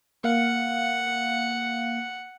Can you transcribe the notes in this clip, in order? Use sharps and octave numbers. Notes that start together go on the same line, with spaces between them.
A#3 F5 F#5 C#7